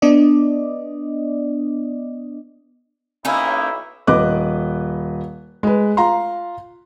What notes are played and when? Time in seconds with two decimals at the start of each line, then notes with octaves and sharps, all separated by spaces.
0.02 B3 D4 D5 D#5
3.25 B1 A#3 C#4 D#4 E4
4.07 D#1 B4 D#5 D6 F#6
5.63 G#3 B4
5.97 F4 F5 A#5 C6